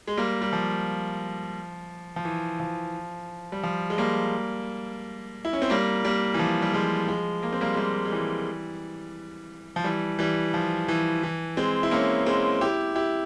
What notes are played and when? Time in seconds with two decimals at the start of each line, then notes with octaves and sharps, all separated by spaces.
0.07 G#3
0.17 G3 A#3
0.41 G3
0.53 F3
2.16 F3
2.25 E3
2.60 F3
3.52 G3
3.63 F3
3.90 G#3
3.98 G3 A#3
5.45 E4
5.53 C#4
5.62 C4
5.70 G3 A#3
6.04 G3 A#3
6.34 E3
6.39 F3
6.62 G3
6.73 F3 G#3
7.08 F3 G#3
7.43 A#3
7.52 C4
7.61 G3 A#3
7.74 G#3
7.77 G3 A#3
8.05 G#3
8.12 E3 G3
9.76 F3
9.84 E3 G3
10.19 E3 G3
10.54 F3
10.88 E3
11.23 E3
11.57 G#3 C4
11.83 E4
11.91 A#3 C#4
12.26 G#3 C4
12.61 E4 G4
12.95 E4 G4